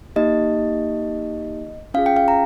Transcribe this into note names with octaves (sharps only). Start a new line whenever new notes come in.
A#3 D#4 G4 D#5
C#4 F4 G#4 F5
G5
F5
A#5